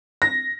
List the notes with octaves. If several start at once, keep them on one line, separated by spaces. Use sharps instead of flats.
A#6